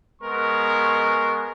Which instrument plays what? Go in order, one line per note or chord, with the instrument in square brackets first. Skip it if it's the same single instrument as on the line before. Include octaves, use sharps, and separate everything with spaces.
[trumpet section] G#3 B3 A#4 C#6